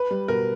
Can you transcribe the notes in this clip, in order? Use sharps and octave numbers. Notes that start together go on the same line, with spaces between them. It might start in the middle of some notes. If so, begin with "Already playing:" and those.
Already playing: B4
G3
B2 A#4